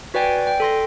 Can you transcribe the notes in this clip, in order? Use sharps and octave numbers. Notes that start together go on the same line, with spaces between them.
F#4 B4 D5 G5 G#5
G5
A4 C6 A#6